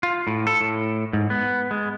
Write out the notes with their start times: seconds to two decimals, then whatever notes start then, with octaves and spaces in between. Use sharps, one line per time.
0.03 F4
0.27 A2
0.47 A4
0.61 A2
1.13 G#2
1.30 B3
1.71 G#3